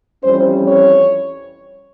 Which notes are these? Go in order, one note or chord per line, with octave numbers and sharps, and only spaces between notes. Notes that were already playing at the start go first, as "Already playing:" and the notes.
F2 E3 G3 C#4 C5
C#5